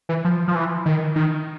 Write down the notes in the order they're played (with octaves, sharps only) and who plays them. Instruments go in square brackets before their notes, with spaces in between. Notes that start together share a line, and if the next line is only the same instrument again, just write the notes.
[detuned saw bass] E3
F3
F3
E3
D#3
D#3